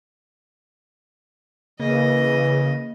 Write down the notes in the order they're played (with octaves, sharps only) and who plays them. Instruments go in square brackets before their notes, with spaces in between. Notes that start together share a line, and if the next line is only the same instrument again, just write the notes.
[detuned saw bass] C#3 [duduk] E3 [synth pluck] A#3 [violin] D#5 D#7